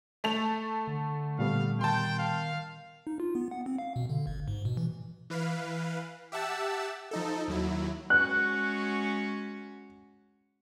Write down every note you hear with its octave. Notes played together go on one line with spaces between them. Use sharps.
A3 A4 F7
D3
A#2 G3 B3 F5
D#3 G5 A5 C6
F5
D#4
F4
B3
F#5
C4
F5
B2
D3
G#1
G#2
B2
E3
E3 B4 F5
G4 E5 F#5 A5 E6
F3 D#4 A4
D#2 F#3 E4
G#3 C#4 F#4 F#6